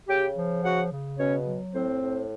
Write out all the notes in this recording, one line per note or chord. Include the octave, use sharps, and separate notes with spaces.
C#3 G4 G5
F3
C#3 F#4 F#5
C#3
B2 C#4 C#5
F#3
A2 C4 C5
A2